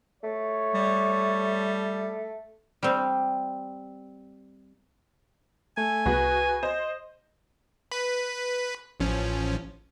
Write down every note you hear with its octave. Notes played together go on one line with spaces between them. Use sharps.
A3 C#5
G3
G3 C4
A3 G#5
C2 B3 F#4 G#4 B4
C5 D#5
B4 B5
A1 F3 C#4